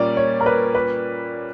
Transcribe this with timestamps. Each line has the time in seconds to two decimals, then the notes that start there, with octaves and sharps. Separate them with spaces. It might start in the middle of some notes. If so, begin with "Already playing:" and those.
Already playing: A#2 G3 A#3 C#4 D5
0.17 C#5
0.41 A#4
0.46 B4
0.75 B4